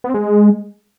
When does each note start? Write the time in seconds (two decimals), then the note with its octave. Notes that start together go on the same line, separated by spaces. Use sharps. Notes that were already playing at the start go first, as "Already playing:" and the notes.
0.04 B3
0.09 C4
0.14 G#3